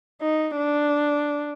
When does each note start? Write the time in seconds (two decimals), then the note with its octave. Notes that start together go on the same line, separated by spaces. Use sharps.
0.22 D#4
0.56 D4